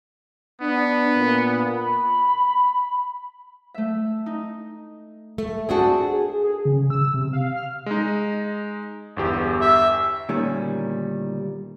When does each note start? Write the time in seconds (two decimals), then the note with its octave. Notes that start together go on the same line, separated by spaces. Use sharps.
0.61 B3 D4
1.16 A#2
1.77 B5
3.74 A3 E5
4.26 D#4
5.38 A3
5.69 C4 D4 F#4 G#4 G5 A5
6.13 G#4
6.43 G#4
6.65 C#3
6.90 E6
7.14 C3
7.33 F5
7.56 F6
7.86 G#3 D#4
9.17 G1 E2 G4
9.61 E5
10.29 D2 A#2 D#3 G3 C#4